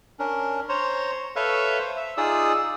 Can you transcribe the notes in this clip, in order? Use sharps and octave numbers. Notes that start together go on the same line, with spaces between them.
C#4 D4 A#4
C5 C#5 A#5 C6
A4 B4 C#5 E5 F5 C#6
C5
E5
D#4 F4 G#4 D5 D#6 E6